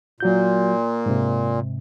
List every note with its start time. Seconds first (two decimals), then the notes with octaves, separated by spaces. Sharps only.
0.20 A#2 F#3 F#4 G6
1.06 G#2 C3